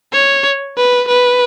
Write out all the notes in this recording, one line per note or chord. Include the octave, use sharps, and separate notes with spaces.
C#5
B4
B4